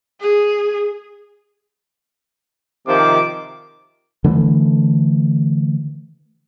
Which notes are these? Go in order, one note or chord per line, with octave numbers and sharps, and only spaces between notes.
G#4
C3 D#3 F3 D6
D3 E3 A3